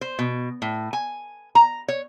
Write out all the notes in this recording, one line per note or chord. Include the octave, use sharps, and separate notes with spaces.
C5
B2
A2
G#5
A#5
C#5